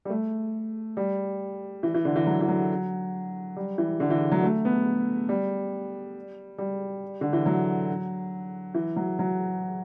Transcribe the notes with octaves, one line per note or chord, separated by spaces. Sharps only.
G3
A3
G3
E3
E3
D3
E3
F#3
E3
F#3
G3
E3
D3
E3
F#3
A3
B3
G3
G3
D3
E3
F#3
E3
F#3
F#3